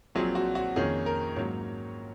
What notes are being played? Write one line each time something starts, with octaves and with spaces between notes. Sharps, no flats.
A#1 A#2 F#3 C4 G#4
F#4
F#4
F2 D#3 A#3 C#4 G#4
A#4
G#2 F#3 A#3 C#4 C#5